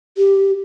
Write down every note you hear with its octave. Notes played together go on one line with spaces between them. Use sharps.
G4